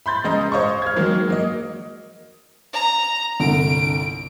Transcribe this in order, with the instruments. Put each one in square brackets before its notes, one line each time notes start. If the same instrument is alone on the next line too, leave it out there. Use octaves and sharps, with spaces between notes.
[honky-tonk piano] B5 C6 G6 A6
C#2 G#3 D#5 A#5
C5 C#5 D#5 F5 C#6
F6 G#6
D#3 F#3 G#3 A#3
F#3 A#3 D#5
[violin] A#5
[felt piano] G1 C2 D3 [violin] D7